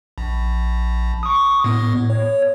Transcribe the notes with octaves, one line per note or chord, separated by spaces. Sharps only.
A#1
C#6 D#6
A2 B3
C#5